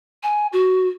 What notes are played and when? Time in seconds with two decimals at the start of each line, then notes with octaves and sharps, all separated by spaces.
0.23 G#5
0.53 F#4